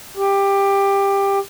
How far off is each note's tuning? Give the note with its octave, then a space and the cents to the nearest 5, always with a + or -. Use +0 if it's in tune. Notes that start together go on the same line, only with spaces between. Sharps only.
G4 +15